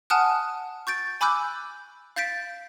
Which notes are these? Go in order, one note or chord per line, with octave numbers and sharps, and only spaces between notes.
F#5 G#5 A5 D#6 F6 F#6
C#6 G6 A6 D7
G#5 B5 D6 E6 F#6 G6
F5 G6 A6 B6 D7